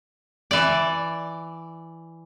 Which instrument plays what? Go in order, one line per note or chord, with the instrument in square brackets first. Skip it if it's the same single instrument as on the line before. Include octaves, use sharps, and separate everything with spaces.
[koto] E3 D5